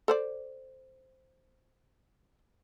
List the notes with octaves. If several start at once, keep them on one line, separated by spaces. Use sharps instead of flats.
A4 C5 D5